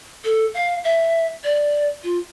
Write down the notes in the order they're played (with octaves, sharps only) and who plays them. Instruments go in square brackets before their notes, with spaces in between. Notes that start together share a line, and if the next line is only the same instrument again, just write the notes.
[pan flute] A4
F5
E5
D5
F4